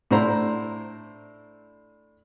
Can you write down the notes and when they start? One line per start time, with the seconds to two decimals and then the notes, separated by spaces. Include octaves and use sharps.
0.11 A2 D4 E4 C5 A#5 B5